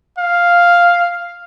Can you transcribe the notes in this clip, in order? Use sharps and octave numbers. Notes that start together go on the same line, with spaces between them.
F5